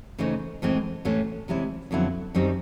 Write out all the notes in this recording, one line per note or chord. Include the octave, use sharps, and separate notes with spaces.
C#3 E3 A3 C4 D#4
A2 E3 G#3 C4
A2 E3 A3 C#4
C3 E3 G#3 C#4 E4
F2 D3 F#3 B3 E4
F#2 D#3 G3 C4 D#4